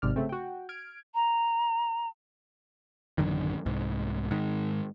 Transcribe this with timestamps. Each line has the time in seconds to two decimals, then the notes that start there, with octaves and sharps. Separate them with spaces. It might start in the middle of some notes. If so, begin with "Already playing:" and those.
0.02 G#1 G#2 C3 D5 F6
0.16 C#3 A3 C4
0.29 F#4 G5
0.69 F6 G#6 D7
1.14 A#5
3.18 A1 F#2 D3 D#3
3.66 C2 G#2
4.31 G#2 D#3